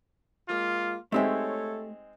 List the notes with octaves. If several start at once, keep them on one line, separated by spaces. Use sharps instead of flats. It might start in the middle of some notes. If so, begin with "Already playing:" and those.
G#3 A#3 F4
G#3 A3 C4 D#4 G4 A4 C#5 E5